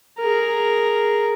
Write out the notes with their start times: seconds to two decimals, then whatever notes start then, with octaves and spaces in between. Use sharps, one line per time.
0.20 G#4 A#4